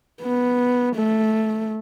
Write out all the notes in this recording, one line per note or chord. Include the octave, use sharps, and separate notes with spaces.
B3
A3